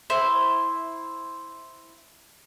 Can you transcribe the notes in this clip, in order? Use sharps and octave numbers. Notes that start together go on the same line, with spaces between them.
E4 C5